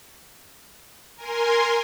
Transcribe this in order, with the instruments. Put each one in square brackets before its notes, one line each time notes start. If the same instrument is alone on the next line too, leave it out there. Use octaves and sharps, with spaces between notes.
[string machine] A#4 G#5 C6